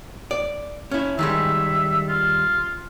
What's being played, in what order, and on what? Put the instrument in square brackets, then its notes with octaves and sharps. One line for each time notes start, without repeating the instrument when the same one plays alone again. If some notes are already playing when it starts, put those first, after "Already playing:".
[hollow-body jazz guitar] D5
C#4 E4
[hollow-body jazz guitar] D#3 G3 G#3 [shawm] E5
[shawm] F4